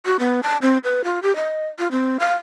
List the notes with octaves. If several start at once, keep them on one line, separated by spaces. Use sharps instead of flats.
F#4
B3
A5
C4
B4
F4
G4
D#5
F4
C4
F5